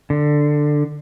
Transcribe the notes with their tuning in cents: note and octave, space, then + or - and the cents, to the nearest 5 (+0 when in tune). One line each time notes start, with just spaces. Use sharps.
D3 +10